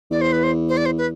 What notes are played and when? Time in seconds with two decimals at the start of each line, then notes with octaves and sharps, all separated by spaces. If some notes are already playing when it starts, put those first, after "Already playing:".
0.11 E2 D5
0.21 C5
0.32 B4
0.43 C5
0.69 C5
0.77 D5
0.86 C5
0.98 B4